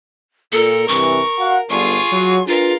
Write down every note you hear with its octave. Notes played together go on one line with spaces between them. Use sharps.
A#2 A4 A#4
G2 C3 E3 C#6
F#4 F5 F#5
G1 D3 F4 G#4 C#6
F#3
D4 F4 G#4 A#4 B4 F5